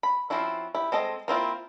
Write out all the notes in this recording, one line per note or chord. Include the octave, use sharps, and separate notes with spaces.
B5
F3 C4 C#4 E4 F#4
E4 G4
G#3 C4 A4 D#5
A#3 C4 E4 F4